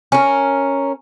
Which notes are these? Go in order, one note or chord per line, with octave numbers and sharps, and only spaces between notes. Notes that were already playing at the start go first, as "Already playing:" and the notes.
C#4 A#4